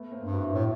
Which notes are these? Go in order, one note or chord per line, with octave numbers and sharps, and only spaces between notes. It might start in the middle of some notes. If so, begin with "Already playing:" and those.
Already playing: A3 B3
A#3 C4
G2
E4 F#4
A2 D4 E4